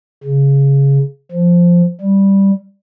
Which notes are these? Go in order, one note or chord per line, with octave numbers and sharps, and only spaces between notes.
C#3
F3
G3